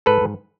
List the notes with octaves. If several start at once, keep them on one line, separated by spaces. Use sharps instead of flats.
G#2 A4 B4
G#2